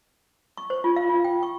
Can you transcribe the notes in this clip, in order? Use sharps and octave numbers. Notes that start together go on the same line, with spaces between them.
C#6
C5
F4
F5
F4
G5
C#6